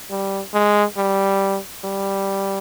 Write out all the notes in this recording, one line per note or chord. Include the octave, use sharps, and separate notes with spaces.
G3
G#3
G3
G3